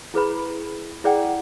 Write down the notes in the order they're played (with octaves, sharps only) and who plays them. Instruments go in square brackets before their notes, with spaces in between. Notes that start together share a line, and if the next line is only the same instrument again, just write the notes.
[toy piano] E4 G#4 B4 B5
E4 G#4 D5 F#5 G5